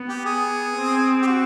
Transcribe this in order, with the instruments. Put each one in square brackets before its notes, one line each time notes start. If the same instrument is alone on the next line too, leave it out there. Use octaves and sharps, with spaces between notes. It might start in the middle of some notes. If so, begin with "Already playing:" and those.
Already playing: [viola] B3
[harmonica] G4
G#4
[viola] C4
[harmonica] G4
F#4